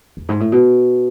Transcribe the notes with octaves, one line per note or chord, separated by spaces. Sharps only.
E2
G#2
A2
B2